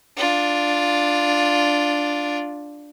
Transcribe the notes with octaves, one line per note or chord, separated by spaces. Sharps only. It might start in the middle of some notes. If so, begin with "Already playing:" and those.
D4 F4